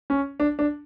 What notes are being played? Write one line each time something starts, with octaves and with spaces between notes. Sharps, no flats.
C#4
D4
D4